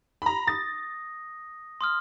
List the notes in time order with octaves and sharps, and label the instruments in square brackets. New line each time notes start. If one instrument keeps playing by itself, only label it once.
[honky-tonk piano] A#5 B5
[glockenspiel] D#6 A#6 [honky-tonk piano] A6
[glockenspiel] C6 D#6 F6